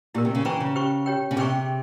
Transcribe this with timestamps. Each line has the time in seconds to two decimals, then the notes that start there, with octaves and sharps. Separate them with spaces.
0.14 A#2 E4 G4 A#4
0.25 C3
0.35 C#3
0.45 E3 C5 G5 A#5 C#6
0.60 C#3
0.76 G4 C5 G5 C#6
1.06 G4 C#5 G5
1.31 C#3
1.37 C3 G#4 C5 G5 C#6